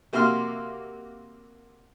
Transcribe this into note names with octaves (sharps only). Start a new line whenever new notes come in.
C3 A#3 F#4 E5 C6 F6